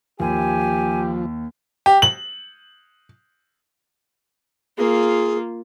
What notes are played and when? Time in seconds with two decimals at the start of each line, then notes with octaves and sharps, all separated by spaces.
0.20 D#2 F3 G4 G#5
1.86 G4
2.02 F#7
4.78 A#3 F4 G#4